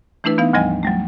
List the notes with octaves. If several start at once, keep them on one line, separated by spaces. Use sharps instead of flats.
E3 A3 D4 E4 B4
E3 B3 D#4 F5
D2 G#2 F3 G3 D#5 G#5
F#3 G3 A3